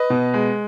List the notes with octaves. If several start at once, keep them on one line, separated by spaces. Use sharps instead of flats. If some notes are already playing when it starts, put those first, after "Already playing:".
Already playing: B4 D#5
B2
G#3